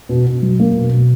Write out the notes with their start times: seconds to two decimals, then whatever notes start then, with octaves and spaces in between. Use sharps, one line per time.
0.09 B2
0.27 B2
0.42 F#3
0.60 A#3
0.76 B2
0.93 B2